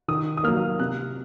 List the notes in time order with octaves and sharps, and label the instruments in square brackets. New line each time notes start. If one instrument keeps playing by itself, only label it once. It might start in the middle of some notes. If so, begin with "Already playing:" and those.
[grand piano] D#3 D#6
D#6
F#3 A#3 F6
C3 F#6